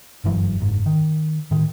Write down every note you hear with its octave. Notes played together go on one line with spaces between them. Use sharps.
F#1 G2 E3 F#3
F#1 G#2
D#3
A2 D#3